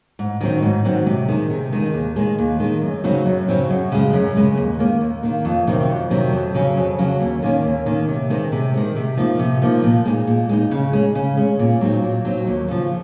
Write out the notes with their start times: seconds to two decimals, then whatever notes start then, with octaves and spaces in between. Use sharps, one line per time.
0.19 G#2
0.41 D#3 F#3 C4 D#4
0.62 G#2
0.85 D#3 F#3 C4 D#4
1.06 C3
1.29 D#3 G#3 D#4
1.50 C3
1.72 D#3 G#3 D#4
1.94 D#2
2.16 D#3 G#3
2.38 D#2
2.60 D#3 G#3
2.82 F#2
3.04 C#3 F#3 C4 D#4
3.26 F#2
3.48 C#3 F#3 C4 D#4
3.70 F#2
3.92 C#3 G#3
4.13 F#2
4.36 C#3 G#3
4.57 D#2
4.79 D#3 A#3
5.01 D#2
5.23 D#3 A#3
5.45 F2
5.67 C3 D#3 F#3 C4
5.89 F2
6.10 C3 D#3 F#3 C4
6.32 F2
6.55 C#3 F#3 C#4
6.77 F2
6.98 C#3 F#3 C#4
7.21 D#2
7.42 D#3 A#3 C#4
7.64 D#2
7.86 D#3 A#3 C#4
8.08 C3
8.30 D#3 G#3 C4
8.52 C3
8.74 D#3 G#3 C4
8.96 C3
9.17 F3 A#3 D#4
9.39 C3
9.62 F3 A#3 D#4
9.84 A#2
10.05 G#3 C4 D#4
10.27 A#2
10.49 G#3 C4 D#4
10.71 C#3
10.93 G#3 C#4
11.15 C#3
11.37 G#3 C#4
11.59 A#2
11.81 F#3 C4 D#4
12.03 A#2
12.25 F#3 C4 D#4
12.47 D#2
12.68 C#3 F3